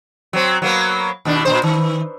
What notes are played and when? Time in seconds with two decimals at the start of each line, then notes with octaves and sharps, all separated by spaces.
0.33 F#3 C4
0.62 F#3 A#3 B3
1.25 D#2 B2 D4
1.45 A#2 D3 C5
1.64 D#3